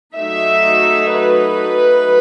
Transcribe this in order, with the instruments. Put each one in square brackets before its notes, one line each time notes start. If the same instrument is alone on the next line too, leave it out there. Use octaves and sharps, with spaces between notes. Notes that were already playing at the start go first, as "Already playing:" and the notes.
[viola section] F#3 A3 D#4 E5
B4